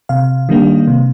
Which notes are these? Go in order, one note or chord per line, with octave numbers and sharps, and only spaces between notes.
C3 F5
D#3 G3 A#3 D4
C3